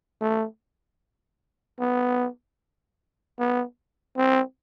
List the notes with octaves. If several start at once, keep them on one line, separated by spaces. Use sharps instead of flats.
A3
B3
B3
C4